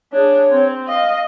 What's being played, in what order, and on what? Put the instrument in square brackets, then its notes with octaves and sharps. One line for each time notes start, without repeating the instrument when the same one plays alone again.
[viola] D4 G#4 [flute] C#5
[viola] C4
[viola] D#5 [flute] F5